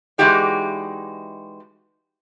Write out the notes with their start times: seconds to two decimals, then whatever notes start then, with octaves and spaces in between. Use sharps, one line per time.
0.18 E3 G#3 D#4 F#4 G4 D5